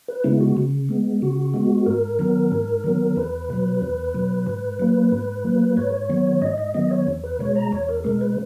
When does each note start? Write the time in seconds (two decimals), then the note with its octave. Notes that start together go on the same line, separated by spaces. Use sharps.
0.08 B4
0.24 C#3 G#3 B3 E4
0.41 F#4
0.57 C#3
0.89 G#3 B3
1.22 C#3 F#4
1.54 G#3 B3
1.86 G#2 A#4
2.19 D#3 F#3 B3
2.52 G#2
2.84 D#3 F#3 B3
3.16 E2 B4
3.50 B2 F#3
3.82 E2
4.14 B2 F#3
4.46 G#2
4.80 F#3 A#3
5.12 G#2
5.44 F#3 A#3
5.77 G#2 C#5
6.09 D#3 F#3 B3
6.42 G#2 D#5
6.58 D#5
6.74 D#3 F#3 B3 D#5
6.91 C#5
7.07 E2
7.24 B4
7.39 B2 G#3 C#5
7.55 A#5
7.72 E2 C#5
7.89 A#4
8.04 B2 G#3 A#4
8.21 B4